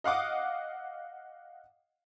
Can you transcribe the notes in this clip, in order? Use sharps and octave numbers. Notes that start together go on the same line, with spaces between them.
D#5 F5 F#5 D6 D#6